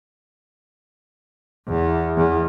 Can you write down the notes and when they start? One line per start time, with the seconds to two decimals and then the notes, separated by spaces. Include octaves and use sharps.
1.68 E2
2.17 E2